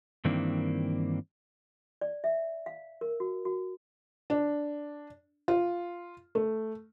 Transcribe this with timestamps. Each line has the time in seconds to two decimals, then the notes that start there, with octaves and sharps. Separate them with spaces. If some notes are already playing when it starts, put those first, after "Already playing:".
0.25 G2 D#3 E3 A#3 C4 D4
2.01 D5
2.24 E5
2.66 F5
3.01 A#4
3.20 F#4
3.45 F#4
4.30 D4
5.48 F4
6.35 A3